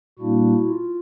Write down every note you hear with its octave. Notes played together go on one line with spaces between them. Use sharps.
A#2 G3 A#3 D4 E4 F#4
F4